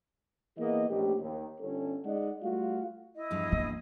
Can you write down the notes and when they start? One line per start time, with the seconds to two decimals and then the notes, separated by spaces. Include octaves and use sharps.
0.58 E3 A#3 B3 G#4 D#5
0.89 A#1 A3 C#4 G4
1.20 D#2
1.61 G1 C#4 A4
2.04 G#3 D#4 D5 D#5 F#5
2.42 G3 A3 F4 F#4 F5
3.16 E4 D#5
3.31 E2 G2 F3
3.52 A#3